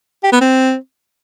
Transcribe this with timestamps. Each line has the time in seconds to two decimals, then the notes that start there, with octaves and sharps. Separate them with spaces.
0.23 G4
0.32 B3
0.41 C4